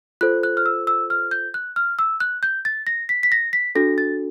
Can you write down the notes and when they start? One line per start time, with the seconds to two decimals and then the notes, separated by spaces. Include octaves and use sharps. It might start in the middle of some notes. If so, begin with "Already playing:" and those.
0.21 F4 A4 C5 F#6
0.43 F#6
0.57 F6
0.66 E6
0.87 E6
1.10 F6
1.31 G6
1.54 F#6
1.76 F6
1.99 E6
2.20 F#6
2.43 G6
2.65 A6
2.87 A#6
3.09 B6
3.23 B6
3.32 A#6
3.53 B6
3.75 D4 F#4 A4 A#6
3.98 A6